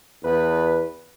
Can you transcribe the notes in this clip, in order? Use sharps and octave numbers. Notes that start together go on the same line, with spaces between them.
E2 B4